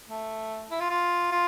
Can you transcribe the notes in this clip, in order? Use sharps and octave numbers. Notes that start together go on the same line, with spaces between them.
A3
E4
F4
F4
F4